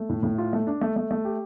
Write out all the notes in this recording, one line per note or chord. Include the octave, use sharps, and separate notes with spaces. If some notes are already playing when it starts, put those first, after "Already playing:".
Already playing: A3
A2
A2
F4
A3
D4
A3
A3
A3
G4